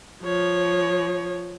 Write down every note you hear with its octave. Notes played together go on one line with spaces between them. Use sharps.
F3 C#5